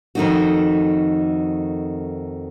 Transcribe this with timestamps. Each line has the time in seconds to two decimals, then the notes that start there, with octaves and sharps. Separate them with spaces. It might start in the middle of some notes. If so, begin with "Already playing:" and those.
0.15 F2 D#3 A3 D#4 F#4